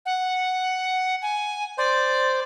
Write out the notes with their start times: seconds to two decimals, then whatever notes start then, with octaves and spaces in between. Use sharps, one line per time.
0.06 F#5
1.22 G#5
1.78 C5 D5